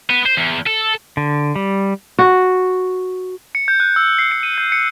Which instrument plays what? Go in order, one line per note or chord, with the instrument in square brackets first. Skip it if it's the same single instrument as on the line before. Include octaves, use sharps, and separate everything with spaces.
[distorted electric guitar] B3
C5
E2
A4
[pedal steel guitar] D3
G3
[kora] F#4
[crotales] C#7
G6
F#6
E6
C7
C#7
D#7
G6
C#7